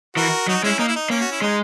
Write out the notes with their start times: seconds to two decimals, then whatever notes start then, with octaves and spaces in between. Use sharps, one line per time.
0.16 E3 F#4 A#4
0.47 F#3 D#4 F#4
0.63 G#3 C#4 E4
0.79 A#3 D#4
0.88 E4
0.96 D#4
1.10 A#3 C#4
1.21 F#4
1.32 E4
1.42 G#3 D#4